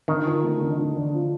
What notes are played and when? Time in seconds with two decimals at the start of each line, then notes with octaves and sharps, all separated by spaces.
0.08 D3 D#3
0.25 F3
0.43 A3
0.61 D3
0.79 D3
0.96 D4
1.14 F3